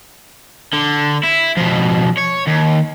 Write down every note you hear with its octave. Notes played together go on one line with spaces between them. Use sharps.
D3
E4
F2 B2
C#5
D#2